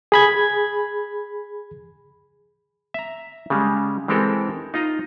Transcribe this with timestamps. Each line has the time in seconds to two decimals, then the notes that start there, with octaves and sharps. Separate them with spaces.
0.12 G#4 B5 G#6
2.94 E5 A#5
3.50 C#3 G3 G#3
4.08 E3 G#3 C4 G4 A4 A#4
4.74 D#4 F4 D#5 A#5